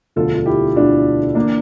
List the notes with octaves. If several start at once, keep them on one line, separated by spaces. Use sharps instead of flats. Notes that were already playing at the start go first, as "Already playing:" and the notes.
E1 D2 D3 F3 F4 A4
F4
E4 G4
E1 D2 D3 F3 D4 F4
E3 A#3 D4